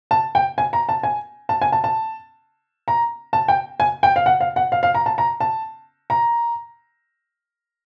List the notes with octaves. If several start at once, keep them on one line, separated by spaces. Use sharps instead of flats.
A5
G5
G#5
A#5
A5
G#5
A5
G#5
A5
A5
A#5
A5
G5
G#5
G5
F5
F#5
F5
F#5
F5
F5
A#5
A5
A#5
A5
A#5